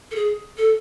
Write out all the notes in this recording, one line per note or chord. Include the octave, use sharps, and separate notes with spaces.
A4
G#4
A4